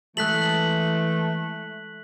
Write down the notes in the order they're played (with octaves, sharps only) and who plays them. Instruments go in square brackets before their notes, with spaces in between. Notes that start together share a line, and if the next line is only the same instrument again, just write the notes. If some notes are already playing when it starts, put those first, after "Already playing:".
[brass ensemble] E3 [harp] G#3 A4 [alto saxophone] A3 [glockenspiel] F#6 B6 F#7